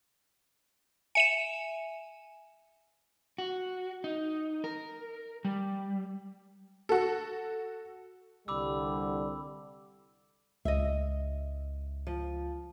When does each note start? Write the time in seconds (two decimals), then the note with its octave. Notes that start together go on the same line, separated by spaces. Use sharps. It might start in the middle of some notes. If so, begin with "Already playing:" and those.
1.15 E5 G#5 C#7 D#7 E7
3.38 F#4
4.04 D#4
4.64 A#4
5.45 G3
6.89 F#4 A4
8.48 C2 D3 G3 B5 D6 E6
10.65 C#2 D#5 E5
12.07 F3